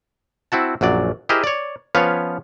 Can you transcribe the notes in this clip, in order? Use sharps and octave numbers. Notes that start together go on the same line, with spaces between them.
C4 E4 F#4 A5
A#1 F#2 F#3 D5
E4 G4 G#4 A#4 C5 D#5
C#5 D5
F3 B3 C#4 B4 C#5 F5